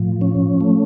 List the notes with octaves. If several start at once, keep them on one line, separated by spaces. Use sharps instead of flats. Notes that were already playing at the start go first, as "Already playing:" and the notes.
Already playing: A2 F3
C#4
A3